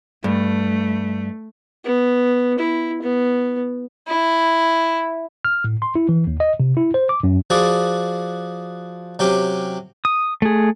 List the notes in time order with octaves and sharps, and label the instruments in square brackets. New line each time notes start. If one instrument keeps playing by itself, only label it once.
[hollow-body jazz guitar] G2 [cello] A3
[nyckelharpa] B3
E4
B3
[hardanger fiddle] E4
[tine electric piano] F6
A2
C6
E4
E3
D#2
D#5
C3
E4
C5
D6
F#2
[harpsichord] F3 F#4 G#4 D5
C3 F#3 C#4 G4 G5
[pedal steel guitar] D#6
A3 G#4